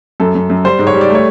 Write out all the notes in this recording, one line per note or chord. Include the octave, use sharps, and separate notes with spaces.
F#2 A4
F#2
F#2
G3 C5
G#2
C#5
G3
D5
A3
C#5